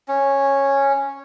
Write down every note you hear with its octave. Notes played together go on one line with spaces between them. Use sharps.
C#4